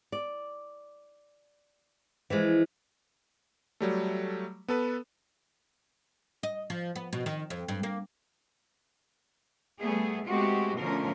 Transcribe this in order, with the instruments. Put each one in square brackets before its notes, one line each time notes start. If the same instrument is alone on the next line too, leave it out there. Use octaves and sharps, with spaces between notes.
[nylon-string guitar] D5
E3 F3 G#3
[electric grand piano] F#3 G3 A3
B3 A4 B4
[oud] D#5
F3
B3
B2
D#3
F2
G2
A#3
[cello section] G3 A3 B3 G#4
G#3 A3 B3 C4 F#4 G4
B2 D3 F3 A3 C#4 A#4